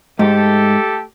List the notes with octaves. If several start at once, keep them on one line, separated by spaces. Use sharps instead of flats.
G#2 A3 G4 A4